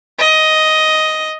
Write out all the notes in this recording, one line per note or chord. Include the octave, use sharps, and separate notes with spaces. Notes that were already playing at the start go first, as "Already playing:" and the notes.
D#5